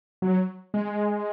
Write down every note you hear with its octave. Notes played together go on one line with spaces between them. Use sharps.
F#3
G#3